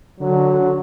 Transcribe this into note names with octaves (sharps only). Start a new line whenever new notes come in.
D3 F#3